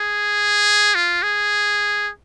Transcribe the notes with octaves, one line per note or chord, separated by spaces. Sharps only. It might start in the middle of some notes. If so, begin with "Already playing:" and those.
Already playing: G#4
F4
G#4